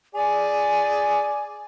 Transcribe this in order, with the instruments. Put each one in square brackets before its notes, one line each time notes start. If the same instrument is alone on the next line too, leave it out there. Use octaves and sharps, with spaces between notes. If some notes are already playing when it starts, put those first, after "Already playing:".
[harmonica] G#4 D5 [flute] G#5